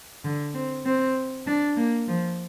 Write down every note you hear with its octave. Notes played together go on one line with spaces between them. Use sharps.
D3
C4
C4
D4
A#3
F3